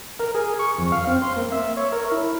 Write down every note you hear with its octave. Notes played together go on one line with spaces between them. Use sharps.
A#4
G#4
C#6
F2
F5
C4
C6
A#3
E5
C#5
A#4
E4